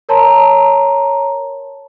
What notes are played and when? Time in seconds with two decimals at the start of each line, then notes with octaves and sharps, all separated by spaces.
0.09 A#4 C#5 A5 A#5 C6